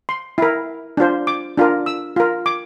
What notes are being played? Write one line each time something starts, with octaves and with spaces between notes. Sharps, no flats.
C6
E4 A#4
D4 F4 C5
D6
D4 F4 A#4
E6
F4 A#4
D6